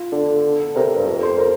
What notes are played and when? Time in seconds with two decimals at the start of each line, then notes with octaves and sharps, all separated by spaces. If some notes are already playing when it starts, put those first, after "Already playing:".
Already playing: F4
0.12 D3 D4
0.60 A4
0.75 C3 A#4
0.96 G2
1.07 F2
1.23 C5
1.38 A#4